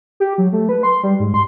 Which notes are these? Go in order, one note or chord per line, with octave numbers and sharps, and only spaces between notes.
G4
F#3
A3
B4
C6
G3
G#2
C6